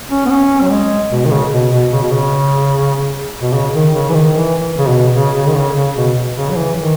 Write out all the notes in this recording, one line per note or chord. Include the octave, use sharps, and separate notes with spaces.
C#4
B3
C#4
F#3
G#3
B2
D#3
C#3
B2
B2
C#3
B2
C#3
B2
C#3
D#3
C#3
E3
D#3
E3
C#3
B2
C#3
C#3
D#3
C#3
C#3
B2
C#3
F#3
E3
D#3